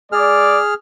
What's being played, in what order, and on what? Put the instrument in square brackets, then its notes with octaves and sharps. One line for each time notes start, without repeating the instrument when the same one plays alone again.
[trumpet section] G#3 D5 [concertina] G#4 F6